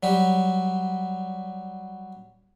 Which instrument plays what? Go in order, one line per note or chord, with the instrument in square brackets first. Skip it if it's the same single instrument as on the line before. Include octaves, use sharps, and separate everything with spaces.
[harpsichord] F#3 G3 G4